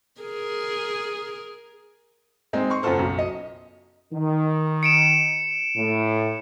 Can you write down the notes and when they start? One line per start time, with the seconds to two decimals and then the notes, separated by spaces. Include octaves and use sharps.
0.21 G#4 A#4
2.53 G#3 C4 D#4
2.70 C6 C#6
2.83 F#2 C#3 F4 F#4 A4 C5
2.97 B1 F#2
3.19 D#5
4.13 D#3
4.83 C#7 D7 E7
5.77 A2